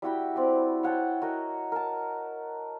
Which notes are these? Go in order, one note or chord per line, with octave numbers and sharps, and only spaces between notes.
G3 E4 F#4 G5
C4 D5 D6
C#5 F#5 G5 A5
F#4 A#4 D#5
A#4 A5